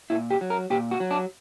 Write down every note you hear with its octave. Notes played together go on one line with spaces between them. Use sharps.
A#2 E4
G4
F#3
A#4
A#2 G4
F#4
F#3
D4